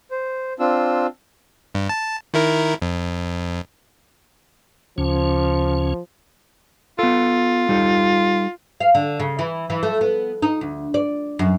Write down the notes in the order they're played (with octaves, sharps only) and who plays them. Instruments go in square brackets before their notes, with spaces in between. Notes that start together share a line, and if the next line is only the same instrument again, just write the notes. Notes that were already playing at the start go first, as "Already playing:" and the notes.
[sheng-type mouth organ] C5
C4 D4 F4 E6
[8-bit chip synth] G2
A5
D#3 E4 A#4
F2
[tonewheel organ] D2 C#3 C#4 [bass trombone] F3
[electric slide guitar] B3 A4 [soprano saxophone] F4
[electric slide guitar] G3 D#4 A4
[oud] F5
D3
C#3
E3
E3
A3
B3
D#4
D2
D5
F#2